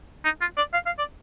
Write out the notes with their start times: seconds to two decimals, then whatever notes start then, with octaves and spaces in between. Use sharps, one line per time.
0.25 D#4
0.41 F4
0.57 D5
0.74 F5
0.86 F5
0.99 D5